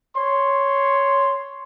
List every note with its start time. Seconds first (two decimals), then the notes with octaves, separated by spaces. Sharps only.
0.16 C#5 C6